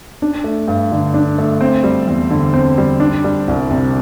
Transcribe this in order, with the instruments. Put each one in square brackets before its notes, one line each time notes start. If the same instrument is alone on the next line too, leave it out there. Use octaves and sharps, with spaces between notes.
[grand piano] D4
A3
G2
D3
D4
A3
C4
G3
E2
D3
C4
G3
D4
G3
C2
C3